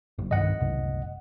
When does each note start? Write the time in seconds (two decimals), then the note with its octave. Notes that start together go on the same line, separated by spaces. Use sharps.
0.18 F#1
0.31 C2 G2 D#3 D#5 F#5
0.60 F#1 C2